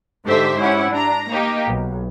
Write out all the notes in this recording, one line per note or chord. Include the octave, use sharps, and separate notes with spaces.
G#2 D3 G4 A4 C5 E5
C#4 E4 G4 F#5
D4 A#5
A#3 D#4 G4
B1